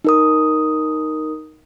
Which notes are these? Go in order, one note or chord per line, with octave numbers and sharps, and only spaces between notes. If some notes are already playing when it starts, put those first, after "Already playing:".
D#4 A#4 D#6